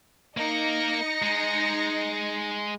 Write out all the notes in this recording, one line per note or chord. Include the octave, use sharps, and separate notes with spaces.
A#3 D#4 A#4 A#6 C#7
G#3